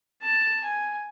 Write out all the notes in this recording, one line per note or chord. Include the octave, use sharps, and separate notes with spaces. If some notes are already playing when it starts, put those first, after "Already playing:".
A5
G#5